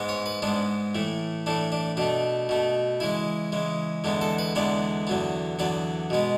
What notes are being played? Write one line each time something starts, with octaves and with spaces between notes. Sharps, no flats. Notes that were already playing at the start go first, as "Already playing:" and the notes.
Already playing: G#2 G#3 B3
C#5
B4
G#2 G#3 B3 D4
A2 E3 A3
A2 E3 A3 D4
D4
B2 A3 D4
B2 A3
C#3 E3 G#3 E4
C#3 E3 G#3
E2 D3 G#3 B3
A4
B4
E2 D3 G#3 B3 D5
E2 D3 F#3 B3
E2 D3 F#3 B3 D5
B2 G#3 B3